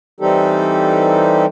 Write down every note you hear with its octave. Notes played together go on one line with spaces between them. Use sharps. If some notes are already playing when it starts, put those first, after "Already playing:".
E3 G3 C4 D#4 G4 A4